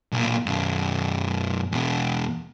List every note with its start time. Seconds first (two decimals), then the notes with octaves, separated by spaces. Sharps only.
0.12 B1 A#2
0.46 F#2 B2
1.72 E2 B2